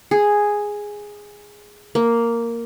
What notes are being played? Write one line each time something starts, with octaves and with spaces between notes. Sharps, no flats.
G#4
A#3